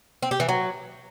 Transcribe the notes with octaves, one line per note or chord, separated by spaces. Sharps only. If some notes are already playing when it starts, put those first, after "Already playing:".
C4
G4
E3
F#3